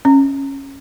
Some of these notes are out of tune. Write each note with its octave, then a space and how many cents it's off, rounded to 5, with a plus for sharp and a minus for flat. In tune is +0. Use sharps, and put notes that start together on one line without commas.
C#4 -10